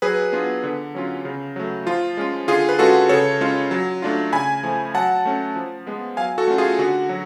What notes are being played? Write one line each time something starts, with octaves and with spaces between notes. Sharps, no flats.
F#3 G#4 B4
B3 D4 F4
D3
F#3 C#4 F4
C#3
F#3 A3
F3 F4
G#3 C#4 F4
D3 F4 G#4
B4
G#3 C#4 F4 F#4 A4
C#3 A4 C#5
G#3 C#4 F4
F#3
A3 D4 F4
C#3 G#5 B5
F3 A3
F#3 F#5 A5
A3 C#4
F3
G#3 B3
F#3 F5 G#5
F#4 A4
A3 C#4 F4
F4 G#4
D3 F#4
F#3